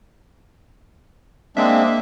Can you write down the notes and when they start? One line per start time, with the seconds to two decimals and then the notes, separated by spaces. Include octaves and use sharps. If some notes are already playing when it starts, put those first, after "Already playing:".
1.57 G#3 A#3 C4 D4 E5